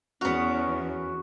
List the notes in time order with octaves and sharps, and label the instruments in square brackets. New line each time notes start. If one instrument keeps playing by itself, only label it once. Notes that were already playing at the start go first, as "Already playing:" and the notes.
[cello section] E2 [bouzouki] B3 A#4 [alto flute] C#4 [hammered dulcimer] F#4